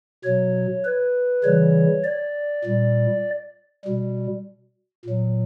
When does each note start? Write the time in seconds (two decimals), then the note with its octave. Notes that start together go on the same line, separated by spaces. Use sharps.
0.24 B2 F#3 C#5
0.85 B4
1.44 C#3 E3 G3 C#5
2.04 D5
2.64 A#2 G3
3.85 B2 G3
5.05 A#2 F#3